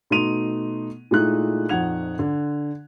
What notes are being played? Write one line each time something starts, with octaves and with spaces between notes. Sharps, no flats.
B2 A3 D#4 C6 D#7 F7
A#2 G#3 A3 D#4 E4 F#6
A#1 F2 D#4 F#5 G#6 F7
D3